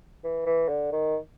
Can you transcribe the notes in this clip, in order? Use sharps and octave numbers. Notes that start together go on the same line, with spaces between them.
E3
E3
D3
D#3